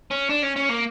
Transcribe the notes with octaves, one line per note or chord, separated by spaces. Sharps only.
C#4
D4
C#4
C#4
A#3